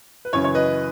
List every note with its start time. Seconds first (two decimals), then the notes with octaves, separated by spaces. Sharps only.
0.25 B4
0.33 F#2 C#3 E3 C#5
0.44 C#5
0.55 B4 D#5